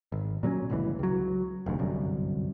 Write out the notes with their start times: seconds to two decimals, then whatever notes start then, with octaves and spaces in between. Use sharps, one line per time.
0.12 G#1
0.43 A#2 F#3 A3 C#4
0.70 G1 C#2 E3
0.99 C#2 F#3
1.66 F1 D2
1.79 G1 C2 F#2